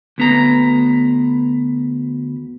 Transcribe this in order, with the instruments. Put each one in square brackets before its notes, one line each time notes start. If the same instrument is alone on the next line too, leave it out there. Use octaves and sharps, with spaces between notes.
[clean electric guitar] D2 B3 A#5